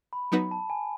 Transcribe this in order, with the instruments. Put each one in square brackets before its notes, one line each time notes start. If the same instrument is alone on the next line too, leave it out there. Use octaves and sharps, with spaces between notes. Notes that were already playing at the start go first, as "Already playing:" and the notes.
[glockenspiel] B5
[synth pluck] F#3 B3 D#4 F#4 B4
[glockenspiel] A5
G#5